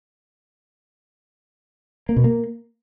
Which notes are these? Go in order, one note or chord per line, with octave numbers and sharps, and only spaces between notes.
A#3
B2
A#3